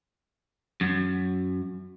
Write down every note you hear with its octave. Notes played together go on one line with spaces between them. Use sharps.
F#2